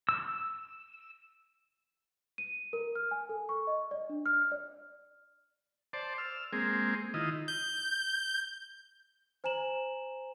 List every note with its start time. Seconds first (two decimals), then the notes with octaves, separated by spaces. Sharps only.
0.09 E6
2.38 D#7
2.73 A#4
2.95 F6
3.11 G#5
3.29 A4
3.49 C#6
3.67 D#5
3.91 D5
4.09 D4
4.26 F6
4.52 D5
5.93 C5 D5 A5
6.18 E6 F6
6.53 G#3 A#3 C4 G#4
7.14 D#3 E4 F4 D#5
7.48 G6
9.44 C5 G#5 A#5 E7 F#7